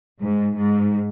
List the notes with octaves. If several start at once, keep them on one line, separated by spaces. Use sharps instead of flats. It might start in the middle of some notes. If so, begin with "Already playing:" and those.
G#2
G#2